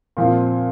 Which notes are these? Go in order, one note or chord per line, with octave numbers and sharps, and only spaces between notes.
A#2 F3 C4 F4